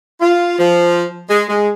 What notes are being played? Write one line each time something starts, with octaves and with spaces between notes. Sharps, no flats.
F4
F3
G#3
G#3